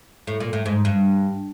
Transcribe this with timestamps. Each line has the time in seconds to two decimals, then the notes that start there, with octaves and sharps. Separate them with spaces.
0.27 A2
0.40 A#2
0.53 A2
0.66 G#2
0.85 G2